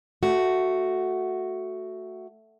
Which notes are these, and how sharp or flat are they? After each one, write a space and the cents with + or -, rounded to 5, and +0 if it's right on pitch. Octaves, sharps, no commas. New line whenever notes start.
A3 +0 F#4 +0